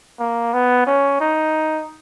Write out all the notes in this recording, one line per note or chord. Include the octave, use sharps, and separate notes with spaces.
A#3
B3
C#4
D#4